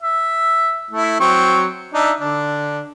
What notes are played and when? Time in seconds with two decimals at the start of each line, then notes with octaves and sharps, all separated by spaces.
0.02 E5
0.91 A3 E4
1.20 F#3 C4 C#6
1.94 D4 D#4 E5
2.20 D3 D4